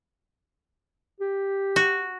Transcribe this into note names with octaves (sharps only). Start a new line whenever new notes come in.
G4
F#4